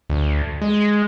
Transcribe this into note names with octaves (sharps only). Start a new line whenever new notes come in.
D2
G#3